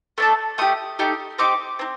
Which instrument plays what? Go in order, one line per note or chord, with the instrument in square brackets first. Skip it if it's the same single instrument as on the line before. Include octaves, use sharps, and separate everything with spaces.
[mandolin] A3 D4 A4
A3 D#4 G4 D#6
A3 D#4 G4
C4 D#4 G4 D6
C4 D#4